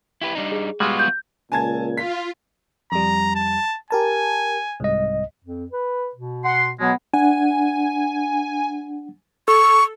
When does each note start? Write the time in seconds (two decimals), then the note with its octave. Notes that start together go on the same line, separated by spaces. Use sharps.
0.21 E4 G4 B4
0.35 G3 D4 D#4
0.52 G#4
0.80 G3 G#3 B3 F4 F#4
0.99 G6
1.52 C#2 A#2 G#5 A5 G#6
1.97 F4 B6
2.92 F2 G3 A#5
3.35 A5
3.90 G4 A#4 G#5 A5
4.80 C2 G#2 D#5
5.44 F2
5.72 B4
6.15 B2
6.45 F#5 C6
6.79 B2 F#3 G#3 B3
7.13 D4 F#5 G#5
9.48 A4 C#6